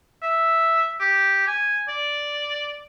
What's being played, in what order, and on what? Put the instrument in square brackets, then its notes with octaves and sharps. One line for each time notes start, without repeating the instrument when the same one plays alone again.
[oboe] E5
G4
G#5
D5